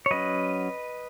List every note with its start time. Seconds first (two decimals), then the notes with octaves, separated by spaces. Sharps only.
0.06 C#5
0.11 F#3 C#4 B4 D#5